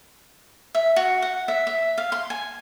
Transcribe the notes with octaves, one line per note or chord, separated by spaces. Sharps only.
E5
F#4
F#5
E5
E5
F5
C6
G#5